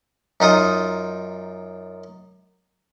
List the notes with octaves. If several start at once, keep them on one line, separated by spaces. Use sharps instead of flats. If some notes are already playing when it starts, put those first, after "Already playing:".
F#2 D#4 F4 D#6